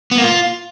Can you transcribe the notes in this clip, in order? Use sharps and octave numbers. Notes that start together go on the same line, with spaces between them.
B3
A#3
F4